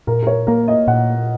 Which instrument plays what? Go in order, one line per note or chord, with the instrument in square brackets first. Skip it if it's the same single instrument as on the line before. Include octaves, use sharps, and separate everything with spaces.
[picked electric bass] A#2 [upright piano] A#4
[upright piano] A#4
C#5
[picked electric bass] A#3 [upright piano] A#4
[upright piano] D#5
[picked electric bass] A#2 [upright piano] F#5